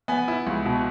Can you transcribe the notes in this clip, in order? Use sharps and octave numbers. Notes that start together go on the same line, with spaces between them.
B3 G#5
E4
C#2
B2